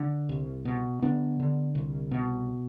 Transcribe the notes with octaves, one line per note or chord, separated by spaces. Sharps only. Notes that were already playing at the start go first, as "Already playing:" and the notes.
Already playing: D3
C2
B2
D3 B3 D4
D3
C2
B2